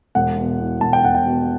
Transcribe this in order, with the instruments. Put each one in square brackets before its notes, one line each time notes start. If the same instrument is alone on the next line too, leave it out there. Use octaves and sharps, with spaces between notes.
[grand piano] E1 F#5
B2
E2
E1 A5
G5
E1 F#5
G5
B2